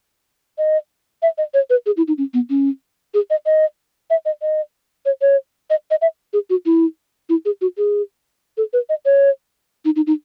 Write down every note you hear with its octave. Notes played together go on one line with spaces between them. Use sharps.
D#5
E5
D#5
C#5
B4
G#4
E4
D#4
C#4
B3
C#4
G#4
D#5
D#5
E5
D#5
D#5
C#5
C#5
D#5
D#5
E5
G#4
F#4
E4
E4
G#4
F#4
G#4
A4
B4
D#5
C#5
D#4
D#4
D#4